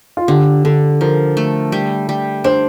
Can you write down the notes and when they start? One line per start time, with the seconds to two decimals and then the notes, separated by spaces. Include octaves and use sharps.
0.17 F4
0.28 D3 G4
0.65 D3 A4
1.01 F3 A#4
1.37 A3
1.72 G3
2.09 G3
2.44 D4 C5